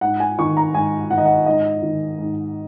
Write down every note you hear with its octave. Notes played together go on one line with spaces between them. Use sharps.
G#2 F#5
G#5
D#3 C#6
A#5
G#2 G#5
D#3 F#5
D#5
F#5
G#2 D#5
D#3
G#2